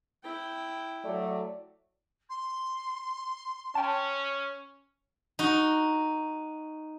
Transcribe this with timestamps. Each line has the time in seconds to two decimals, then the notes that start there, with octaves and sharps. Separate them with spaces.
0.23 E4 G5
1.05 F#3 A3 D5
2.29 C6
3.75 C#4 G5 A5
5.39 D#4 F#4